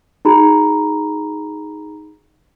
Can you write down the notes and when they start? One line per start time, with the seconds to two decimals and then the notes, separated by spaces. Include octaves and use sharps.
0.25 D#4 F#4 G#4 A#5 B5